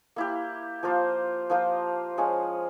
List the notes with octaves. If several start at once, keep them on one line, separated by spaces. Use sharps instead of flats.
A#3 E4 G4
F3 A#3 F4 C5
F3 A#3 F4 C5
F3 G#3 C#4